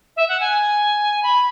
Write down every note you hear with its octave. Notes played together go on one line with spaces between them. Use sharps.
E5
F#5
G#5
B5